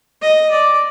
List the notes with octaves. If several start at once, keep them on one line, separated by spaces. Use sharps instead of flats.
D#5
D5